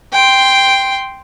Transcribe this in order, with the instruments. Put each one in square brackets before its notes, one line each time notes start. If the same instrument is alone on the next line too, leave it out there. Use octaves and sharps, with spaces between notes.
[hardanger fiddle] G5 C6